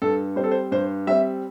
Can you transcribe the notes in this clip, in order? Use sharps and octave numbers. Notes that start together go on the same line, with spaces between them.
G2 A4
G3 C4 C5
A4
C5
G2 C5
G3 C4 E5